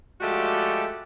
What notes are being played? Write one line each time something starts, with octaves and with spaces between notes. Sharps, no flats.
F3 G#3 A3 F#4 G4 D5